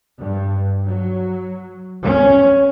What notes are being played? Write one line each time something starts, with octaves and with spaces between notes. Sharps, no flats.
G2
F#3
C#4